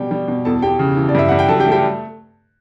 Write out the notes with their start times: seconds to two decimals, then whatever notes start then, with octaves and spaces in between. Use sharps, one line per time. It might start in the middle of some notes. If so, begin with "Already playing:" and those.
Already playing: B2 G3 G4 G5
0.11 G3
0.28 B2
0.45 E2 A4 A5
0.62 E2 G4 G5
0.79 C#3
0.97 E3
1.09 D5
1.15 G2 E5
1.29 G2 F#5
1.39 G5
1.48 F#3 A4 A5
1.60 G4 G5
1.66 A3
1.72 G4 G5